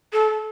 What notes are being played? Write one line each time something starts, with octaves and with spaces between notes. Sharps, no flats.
A4